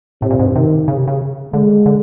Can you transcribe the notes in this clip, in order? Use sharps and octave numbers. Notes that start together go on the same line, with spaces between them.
A2 C3
A#2
G#2
G2
C3 D#3
C#3
C3
C#3
D3 G#3
D3